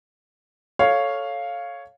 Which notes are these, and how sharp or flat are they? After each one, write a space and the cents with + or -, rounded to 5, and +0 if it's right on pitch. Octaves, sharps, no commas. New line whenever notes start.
A4 +0 C#5 +0 F5 +0